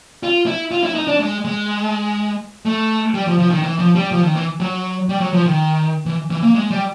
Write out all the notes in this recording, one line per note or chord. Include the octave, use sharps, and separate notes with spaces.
F4
E4
F4
E4
D#4
D4
G#3
G#3
A3
G3
F3
F3
D#3
E3
F3
G3
F3
D#3
E3
F#3
G3
F#3
F3
D#3
E3
E3
A#3
G#3
G3